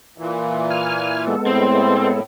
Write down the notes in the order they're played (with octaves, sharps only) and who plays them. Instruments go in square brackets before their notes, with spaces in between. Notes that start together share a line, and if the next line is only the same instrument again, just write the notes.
[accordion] A#2 E3
[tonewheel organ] G#5 F6
G#3 B3 A4
[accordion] A2 [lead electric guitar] C4